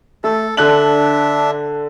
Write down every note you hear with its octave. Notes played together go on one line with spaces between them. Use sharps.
A3 A4
D3 D4 E5 F#6 F#7